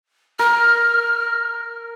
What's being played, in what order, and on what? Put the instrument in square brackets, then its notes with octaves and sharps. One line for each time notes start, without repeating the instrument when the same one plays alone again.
[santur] A#4 [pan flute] F6